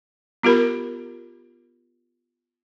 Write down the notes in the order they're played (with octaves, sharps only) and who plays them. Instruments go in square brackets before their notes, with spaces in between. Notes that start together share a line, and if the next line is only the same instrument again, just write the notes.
[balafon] B3 F4 G4 A#4 B5